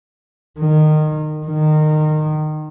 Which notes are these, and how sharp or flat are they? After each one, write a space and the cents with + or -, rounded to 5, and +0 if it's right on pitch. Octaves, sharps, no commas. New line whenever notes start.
D#3 -20
D#3 -25